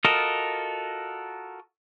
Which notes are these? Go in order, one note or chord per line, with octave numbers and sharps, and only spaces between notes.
F4 F#4 A4 A#4 D#5